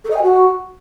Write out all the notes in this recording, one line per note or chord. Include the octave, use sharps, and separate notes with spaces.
A4
D#5
G#5
F#4